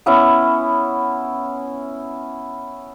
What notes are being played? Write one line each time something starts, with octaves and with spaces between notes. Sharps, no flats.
B3 C#4 E4